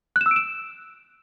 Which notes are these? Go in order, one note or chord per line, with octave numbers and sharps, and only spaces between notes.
F#6
E7
E6
D7
E7